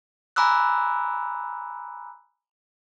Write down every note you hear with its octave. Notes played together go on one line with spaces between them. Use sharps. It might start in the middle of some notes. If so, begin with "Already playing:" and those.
G#5 A#5 B5 D6 E6 F#6